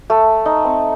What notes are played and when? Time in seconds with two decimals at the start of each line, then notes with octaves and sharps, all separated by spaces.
0.10 A3
0.46 D#4
0.64 C4